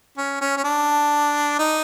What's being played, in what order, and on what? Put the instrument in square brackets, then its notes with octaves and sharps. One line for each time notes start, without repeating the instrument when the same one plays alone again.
[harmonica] C#4
C#4
C#4
D4
D#4